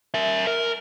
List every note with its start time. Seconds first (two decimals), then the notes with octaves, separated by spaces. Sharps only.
0.14 A#4 E5
0.47 A#4